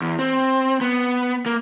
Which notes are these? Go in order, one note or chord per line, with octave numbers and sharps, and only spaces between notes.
E2
C4
B3
A#3